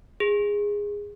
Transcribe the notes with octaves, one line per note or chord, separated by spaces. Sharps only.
G#4